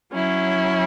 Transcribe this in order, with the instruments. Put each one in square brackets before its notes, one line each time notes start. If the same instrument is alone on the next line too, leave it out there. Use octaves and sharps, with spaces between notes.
[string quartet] F#3 C#4 E4